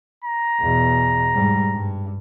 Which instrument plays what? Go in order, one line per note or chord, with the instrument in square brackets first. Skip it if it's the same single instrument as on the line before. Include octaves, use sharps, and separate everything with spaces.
[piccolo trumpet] A#5
[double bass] E2 B2
G#2 G3
G2